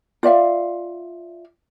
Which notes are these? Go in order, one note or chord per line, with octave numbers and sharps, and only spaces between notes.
F4 D5 E5 F5